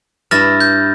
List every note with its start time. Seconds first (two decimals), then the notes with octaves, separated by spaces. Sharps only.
0.31 G2 E4 F6 A6 A#6
0.61 G6